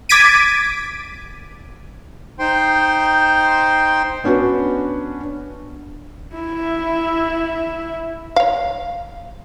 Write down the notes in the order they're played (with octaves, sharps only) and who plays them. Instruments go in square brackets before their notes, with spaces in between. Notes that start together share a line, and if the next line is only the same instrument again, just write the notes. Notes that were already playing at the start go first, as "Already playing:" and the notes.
[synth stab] D6 G#6 A6 B6 D7 D#7
[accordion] D#4 C5 G5 C6
[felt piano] B3 C#4 D4 F#4 B4
[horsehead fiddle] E4 E5
[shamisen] C#5 F5